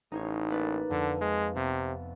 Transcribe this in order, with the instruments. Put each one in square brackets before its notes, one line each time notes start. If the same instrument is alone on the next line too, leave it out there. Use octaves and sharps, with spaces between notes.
[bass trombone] A1 [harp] D#4 C5 C#5
[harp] A#3 B4 D5
[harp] F2 [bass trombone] D3
[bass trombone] G#3
[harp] F1 B3 [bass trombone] C3